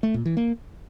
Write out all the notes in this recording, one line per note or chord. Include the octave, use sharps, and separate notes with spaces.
A3
A#2
E3
A#3